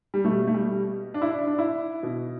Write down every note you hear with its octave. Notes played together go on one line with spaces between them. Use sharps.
G3
B2 A3
A3
G3
D4
E4
D4
D4
E4
B2